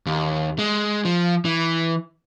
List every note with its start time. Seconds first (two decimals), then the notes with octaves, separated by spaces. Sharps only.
0.06 D#2
0.59 G#3
1.05 F3
1.45 E3